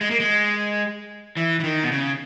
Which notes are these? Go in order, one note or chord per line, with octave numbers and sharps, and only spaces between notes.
G#3
A#3
G#3
E3
E3
D#3
B2
C#3